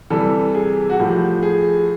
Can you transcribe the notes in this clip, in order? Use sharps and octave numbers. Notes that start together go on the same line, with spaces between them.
C3 E3 G3 A4
G#4
F#4
A2 F3 G4
G#4